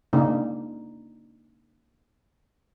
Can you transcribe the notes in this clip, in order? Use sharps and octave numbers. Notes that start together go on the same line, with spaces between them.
C#3 A#3 D4 D#4